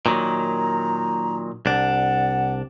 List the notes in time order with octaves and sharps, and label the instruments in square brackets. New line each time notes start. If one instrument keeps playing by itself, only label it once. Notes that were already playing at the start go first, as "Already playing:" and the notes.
[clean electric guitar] A#2 D#3 F#3 [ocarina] A#5
[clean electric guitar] C2 D4 [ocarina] F#5